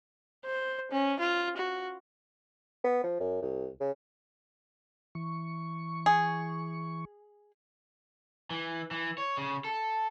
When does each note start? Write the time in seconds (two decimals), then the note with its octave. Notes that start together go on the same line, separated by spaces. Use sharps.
0.45 C5
0.91 C#4
1.20 F4
1.56 F#4
2.84 B3
3.04 F3
3.20 F#2
3.42 C2
3.80 C#3
5.15 E3 C#6
6.06 G#4
8.51 E3
8.91 E3
9.18 C#5
9.37 C#3
9.65 A4